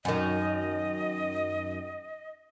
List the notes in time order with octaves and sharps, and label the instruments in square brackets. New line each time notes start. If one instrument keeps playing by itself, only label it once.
[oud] F#2 D#3 [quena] D#5